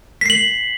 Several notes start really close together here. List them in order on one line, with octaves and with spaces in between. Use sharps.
B6 C7 F#7